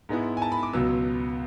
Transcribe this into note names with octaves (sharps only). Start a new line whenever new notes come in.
G#2 G#3 B3 E4
G#5
A5
B5
D6
C#2 B2 F#3 B3 E6